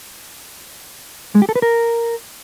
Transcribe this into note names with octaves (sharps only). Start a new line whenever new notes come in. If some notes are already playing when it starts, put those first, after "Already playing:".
G#3
G4
A4
B4
A#4